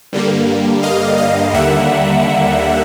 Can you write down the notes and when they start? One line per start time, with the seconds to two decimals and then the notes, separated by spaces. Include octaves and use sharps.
0.13 G2 D3 G3 A#3
0.83 D#5 F5
1.18 D#5 F5
1.53 D#2 D3 G3 A#3 E5 F#5